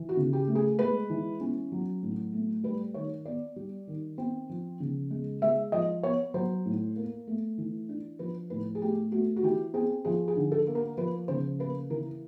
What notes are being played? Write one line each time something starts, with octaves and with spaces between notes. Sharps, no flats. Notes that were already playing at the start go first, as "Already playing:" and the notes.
Already playing: E3
F#4
C#3
G4
A3
G#4
G#3 B4
E3
C#4
F#3
A2
A3
G3 B4
D#3 C#5
B3 D5
G3
D#3
C4
F3
C#3
G#3
G#3 E5
F3 D#5
B3 C#5
F#3 C5
A2
A#3
A3
E3
D4
F3 B4
A2 B4
G#4
A3 G4
A3 F#4
F#4
E3 G4
C4 G#4
F3 G#4
G#4
D3
A4
A#3
A#4
F3 B4
C#3 C5
A#3 B4
E3 A#4